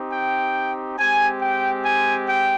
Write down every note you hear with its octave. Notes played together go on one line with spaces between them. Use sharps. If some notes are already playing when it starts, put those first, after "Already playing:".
Already playing: C4 D#4 G4
G5
G#3 C4 G4 G#5
G5
G#5
G5